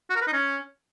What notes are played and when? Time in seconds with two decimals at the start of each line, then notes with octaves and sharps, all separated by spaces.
0.10 F#4
0.16 A#4
0.22 B4
0.27 D#4
0.33 C#4